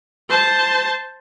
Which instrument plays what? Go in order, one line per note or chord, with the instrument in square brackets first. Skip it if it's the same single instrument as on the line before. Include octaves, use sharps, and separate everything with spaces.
[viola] C5 A5